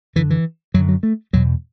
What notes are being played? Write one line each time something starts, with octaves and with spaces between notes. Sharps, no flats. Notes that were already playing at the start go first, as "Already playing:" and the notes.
F#2 D3 E3
E3
F#2 D3 F#3
F#3
A3
E2 B2 F#3